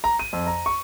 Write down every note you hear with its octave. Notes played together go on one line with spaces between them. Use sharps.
A#5
D#7
F2
A#5
C#6